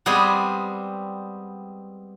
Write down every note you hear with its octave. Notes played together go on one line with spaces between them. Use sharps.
G3 G#3 B3 C4 G#4